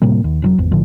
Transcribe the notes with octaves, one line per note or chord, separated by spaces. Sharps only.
A2 C3 G3 A#3
D#2
F1 B2 F#3
G#1 E2
A#1 A2 D3 F3